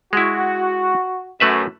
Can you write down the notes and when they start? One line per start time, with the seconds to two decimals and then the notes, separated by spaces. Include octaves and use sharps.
0.13 G#3 E4 F#4
1.40 F#2 A3 B4 E5